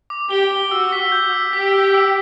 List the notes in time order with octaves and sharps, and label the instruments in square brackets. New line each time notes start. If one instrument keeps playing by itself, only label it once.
[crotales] D6
[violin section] G4 [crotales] G7
[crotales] G7
[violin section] F#4 [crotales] E6
[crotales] B6
G6
E6
[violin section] G4 [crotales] B6
[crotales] E6
E6